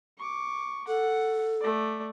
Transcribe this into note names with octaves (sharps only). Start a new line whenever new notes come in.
C#6 D6
A4 F#5
A3 D5